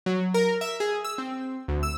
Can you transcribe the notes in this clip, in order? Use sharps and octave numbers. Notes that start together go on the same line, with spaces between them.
F#3
A#4
E5
G#4
E6
C4
D2
E6